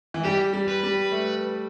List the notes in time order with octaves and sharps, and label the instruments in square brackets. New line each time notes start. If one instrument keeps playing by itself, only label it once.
[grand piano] E3
[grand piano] G3 [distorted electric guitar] G4
[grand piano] G3
[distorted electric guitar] B4
[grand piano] G3
A3